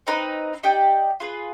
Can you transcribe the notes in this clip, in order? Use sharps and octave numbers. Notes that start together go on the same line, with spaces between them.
C4 D#4 B4
D#4 G4 D5 G5
F4 G#4 B4